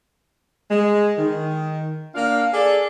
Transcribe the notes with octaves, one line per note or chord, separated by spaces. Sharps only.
G#3
D#3
A#3 D4 F5
G#4 A4 D5